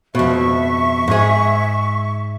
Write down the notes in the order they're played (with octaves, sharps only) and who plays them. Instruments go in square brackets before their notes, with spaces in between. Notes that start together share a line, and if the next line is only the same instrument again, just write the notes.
[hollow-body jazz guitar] F2 B2 [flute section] E5 C#6
[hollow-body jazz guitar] G#2 G#4